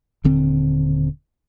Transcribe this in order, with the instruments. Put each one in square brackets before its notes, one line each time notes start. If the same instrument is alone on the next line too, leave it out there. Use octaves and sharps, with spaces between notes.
[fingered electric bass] D#1 D3 C4